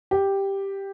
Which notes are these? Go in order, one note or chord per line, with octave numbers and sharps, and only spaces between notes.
G4